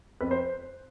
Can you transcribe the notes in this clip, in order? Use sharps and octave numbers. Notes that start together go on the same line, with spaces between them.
F2 B4
C5